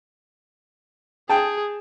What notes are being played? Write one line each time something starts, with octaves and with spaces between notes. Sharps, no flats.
G#4 G5 A5